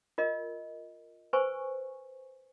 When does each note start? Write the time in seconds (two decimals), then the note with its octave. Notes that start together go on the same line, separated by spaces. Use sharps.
0.18 F4 A#4 D#5
1.33 B4 C5 G#5 C#6